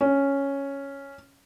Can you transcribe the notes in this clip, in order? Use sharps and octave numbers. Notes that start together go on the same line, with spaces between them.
C#4